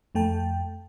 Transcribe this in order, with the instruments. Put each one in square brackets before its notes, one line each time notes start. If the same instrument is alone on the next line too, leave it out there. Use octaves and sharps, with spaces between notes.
[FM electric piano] F2 A3 G5 A5